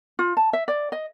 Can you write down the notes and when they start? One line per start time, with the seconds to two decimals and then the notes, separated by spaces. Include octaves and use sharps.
0.19 F4
0.37 A5
0.53 E5
0.68 D5
0.92 D#5